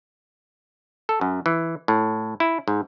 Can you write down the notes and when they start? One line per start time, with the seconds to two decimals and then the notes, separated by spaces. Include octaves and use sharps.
1.09 A4
1.21 F#2
1.46 E3
1.88 A2
2.40 E4
2.68 G#2